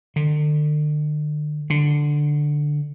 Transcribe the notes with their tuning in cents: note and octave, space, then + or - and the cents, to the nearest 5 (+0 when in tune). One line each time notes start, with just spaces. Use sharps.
D3 +40
D3 +5